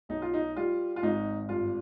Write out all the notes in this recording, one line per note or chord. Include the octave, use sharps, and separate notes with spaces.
B1 D#4
F4
D#4
G3 F4
F4
G#1 D#4
G2 F4